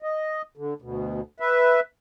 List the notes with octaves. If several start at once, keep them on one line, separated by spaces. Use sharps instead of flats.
D#5
D3
D2 B2
B4 E5